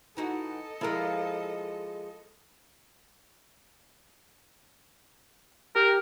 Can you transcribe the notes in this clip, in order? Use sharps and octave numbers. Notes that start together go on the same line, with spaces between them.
E3 D#4 F#4 A4 D#5
F3 G#3 E4 A#4
G4 A#4